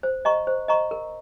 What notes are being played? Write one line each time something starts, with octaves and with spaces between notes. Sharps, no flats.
C5
D#5 A#5 C#6
C5
D#5 A#5 C#6
A#4